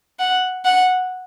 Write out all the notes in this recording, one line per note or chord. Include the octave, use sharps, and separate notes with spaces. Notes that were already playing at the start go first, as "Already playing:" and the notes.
F#5
F#5